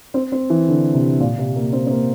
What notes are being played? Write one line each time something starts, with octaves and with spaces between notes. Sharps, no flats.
C4
C4
E3
D3
C3
A#2
C3
A#3
C4
C4
A#3